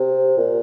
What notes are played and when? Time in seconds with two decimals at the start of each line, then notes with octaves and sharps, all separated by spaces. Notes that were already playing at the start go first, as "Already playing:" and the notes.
Already playing: C3
0.38 A#2